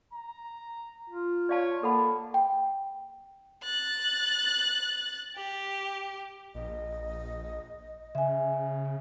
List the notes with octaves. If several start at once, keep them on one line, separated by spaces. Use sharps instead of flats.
A#5
F4
C#5 D5 F5 A5
A#3 A4 F#5 A5 B5
G5
F#6 A6
G4
A#1 D#5
C#3 E5 G#5